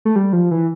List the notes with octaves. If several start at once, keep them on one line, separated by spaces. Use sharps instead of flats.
A3
G3
F3
E3